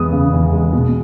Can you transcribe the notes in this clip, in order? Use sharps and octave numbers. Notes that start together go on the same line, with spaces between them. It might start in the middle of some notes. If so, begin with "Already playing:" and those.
Already playing: E2 G#3 B3 D#6
C#3
E2
G#3
B2